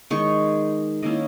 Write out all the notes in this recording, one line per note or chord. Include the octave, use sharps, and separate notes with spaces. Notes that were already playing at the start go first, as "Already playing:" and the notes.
D#3 G#3 D#4 C#6
D#3 A#3 C#4 E4 D#5